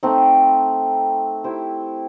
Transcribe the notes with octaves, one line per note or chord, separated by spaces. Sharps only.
A3 C4 D#4
E4 G4 C5